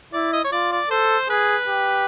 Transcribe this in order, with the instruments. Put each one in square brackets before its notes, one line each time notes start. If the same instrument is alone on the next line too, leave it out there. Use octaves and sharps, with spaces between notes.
[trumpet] E4 [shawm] D5
[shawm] D#5
C#5
[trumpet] F4 [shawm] D5
[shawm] D5
[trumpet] A4 [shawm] C5
[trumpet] G#4 [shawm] B4
[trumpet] G4